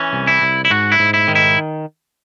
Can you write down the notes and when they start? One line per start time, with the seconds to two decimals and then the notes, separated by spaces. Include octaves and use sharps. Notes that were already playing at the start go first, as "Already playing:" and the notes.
Already playing: E3 C#4
0.13 C2
0.27 E4
0.42 C2
0.65 E4
0.70 G#2 F#4
0.92 E4
0.99 G#2
1.14 E4
1.28 D#3
1.35 E4